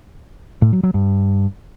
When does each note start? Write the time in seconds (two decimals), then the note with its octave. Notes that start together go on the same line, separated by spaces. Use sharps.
0.62 A2
0.73 F#3
0.83 F#3
0.94 G2